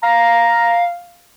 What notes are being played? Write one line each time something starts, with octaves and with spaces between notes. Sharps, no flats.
F5 A#5